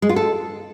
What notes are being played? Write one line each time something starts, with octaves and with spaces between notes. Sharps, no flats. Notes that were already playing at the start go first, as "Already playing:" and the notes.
G#3
F4
A4